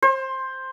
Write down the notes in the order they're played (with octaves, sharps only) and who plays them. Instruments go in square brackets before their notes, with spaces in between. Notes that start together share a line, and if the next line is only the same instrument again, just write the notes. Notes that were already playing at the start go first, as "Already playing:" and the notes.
[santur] C5